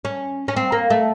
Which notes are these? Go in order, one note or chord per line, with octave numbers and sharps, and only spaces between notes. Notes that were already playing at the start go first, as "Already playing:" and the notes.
C#4
C#4
C4
A#3
A3